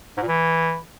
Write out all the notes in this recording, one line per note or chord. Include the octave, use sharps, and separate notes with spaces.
G#2
A#2
E3